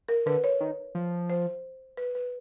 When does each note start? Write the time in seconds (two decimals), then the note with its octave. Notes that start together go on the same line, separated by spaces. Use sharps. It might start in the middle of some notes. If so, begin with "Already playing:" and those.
0.09 A#4
0.26 D3 B4
0.44 C#5
0.60 D#3
0.95 F3
1.30 C5
1.97 B4
2.15 B4